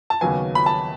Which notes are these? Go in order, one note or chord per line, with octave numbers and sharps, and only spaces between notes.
A5
D#2 C#3 F#3 B3 G#5
B5
A5